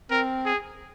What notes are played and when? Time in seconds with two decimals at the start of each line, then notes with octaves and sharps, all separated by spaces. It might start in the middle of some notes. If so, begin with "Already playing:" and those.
0.10 C4 A#4
0.46 G#4